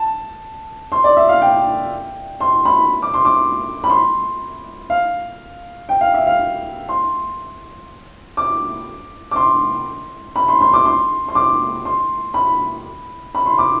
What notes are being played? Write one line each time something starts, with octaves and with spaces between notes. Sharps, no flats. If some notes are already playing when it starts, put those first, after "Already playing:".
Already playing: A5
C6
D5
E5
F5
G5
C6
B5
D6
C6
D6
B5
C6
F5
G5
F5
E5
F5
C6
D6
D6
C6
B5
C6
C6
D6
C6
C6
D6
C6
B5
B5
C6
D6